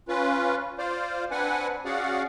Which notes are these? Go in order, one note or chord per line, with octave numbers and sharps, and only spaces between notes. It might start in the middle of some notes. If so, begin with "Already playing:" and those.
C#4 F4 B4
F4 C5 D5 F5
C4 D4 B4 F#5 G#5
C#4 F#4 G#4 D5 F5 F#5